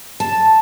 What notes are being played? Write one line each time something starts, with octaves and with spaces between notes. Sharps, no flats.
A5